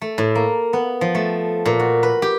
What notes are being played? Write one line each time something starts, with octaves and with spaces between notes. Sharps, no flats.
A3
A2
A#3
B3
F3
A3
A#2
F#4
B4
G4